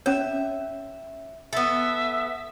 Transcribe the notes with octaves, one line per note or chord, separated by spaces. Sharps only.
C#4 C#5 E5
B3 A4 E5